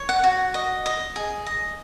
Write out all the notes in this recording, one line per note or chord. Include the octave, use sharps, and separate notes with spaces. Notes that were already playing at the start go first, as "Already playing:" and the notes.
Already playing: C#5
F#5
F#4
D#5
D#5
G#4
D#5